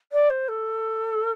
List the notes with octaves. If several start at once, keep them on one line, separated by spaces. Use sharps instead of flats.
D5
C5
A4